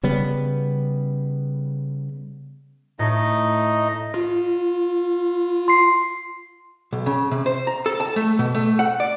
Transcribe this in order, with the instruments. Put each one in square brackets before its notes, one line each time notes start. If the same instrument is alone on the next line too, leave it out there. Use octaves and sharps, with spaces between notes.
[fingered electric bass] C#3 G3 B3
[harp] A2 [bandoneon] A3 D#4 D#5
[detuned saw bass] F4
[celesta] C6 C7
[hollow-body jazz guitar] B1
C#3
C3
C5
A#5
A4
A5
A3
B2
A3
F#5
D5